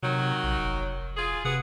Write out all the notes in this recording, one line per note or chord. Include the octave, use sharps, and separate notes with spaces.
C3 D#3 F#3
A#1
F1
F4 G#4
C3 F#4 G#4 B4